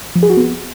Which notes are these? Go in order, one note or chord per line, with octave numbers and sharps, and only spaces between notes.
F3
G#4
F#4
B3